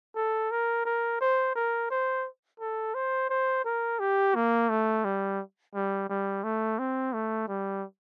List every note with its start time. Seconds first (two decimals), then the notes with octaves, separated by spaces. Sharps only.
0.15 A4
0.51 A#4
0.85 A#4
1.21 C5
1.55 A#4
1.90 C5
2.60 A4
2.94 C5
3.30 C5
3.65 A#4
4.00 G4
4.35 A#3
4.69 A3
5.05 G3
5.75 G3
6.09 G3
6.44 A3
6.79 C4
7.14 A3
7.48 G3